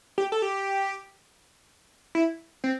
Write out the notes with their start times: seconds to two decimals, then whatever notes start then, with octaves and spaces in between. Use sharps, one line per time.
0.18 G4
0.32 A4
0.42 G4
2.15 E4
2.64 C4